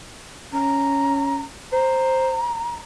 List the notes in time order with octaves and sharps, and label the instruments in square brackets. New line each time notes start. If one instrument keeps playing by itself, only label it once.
[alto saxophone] C#4 [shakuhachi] A#5
[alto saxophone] C5 [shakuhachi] A#5